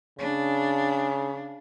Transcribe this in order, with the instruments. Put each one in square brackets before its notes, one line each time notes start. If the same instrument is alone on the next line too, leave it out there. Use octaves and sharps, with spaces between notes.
[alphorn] C#3 [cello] D4